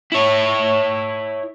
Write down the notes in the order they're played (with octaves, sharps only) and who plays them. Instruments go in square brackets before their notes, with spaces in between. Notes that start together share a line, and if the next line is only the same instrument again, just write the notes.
[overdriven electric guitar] E4 C#5